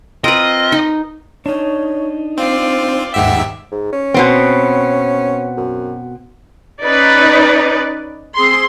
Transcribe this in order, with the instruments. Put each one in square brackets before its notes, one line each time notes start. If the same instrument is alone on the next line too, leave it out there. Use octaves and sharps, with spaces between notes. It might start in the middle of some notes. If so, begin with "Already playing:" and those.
[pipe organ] C4 F4 [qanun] A#4 B4 [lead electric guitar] D#5
[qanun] D#4
[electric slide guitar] D4 D#4 [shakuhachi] C#5
[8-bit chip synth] C4 [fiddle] F4 D5 [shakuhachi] C5
[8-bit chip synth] D#2 G#2 E5 [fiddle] G4 [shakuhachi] F#5
[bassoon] G#2
C#4
[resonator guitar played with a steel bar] B2 B3 C4
[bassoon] F#2
[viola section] C#4 D#4 B4 D5
C4 G#4 C6